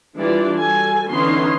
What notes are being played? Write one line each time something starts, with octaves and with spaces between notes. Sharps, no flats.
E3 G3 D4 F4 G4 D5
G3 F#4 A4 G#5
D3 E3 B3 C#4 D#4 C6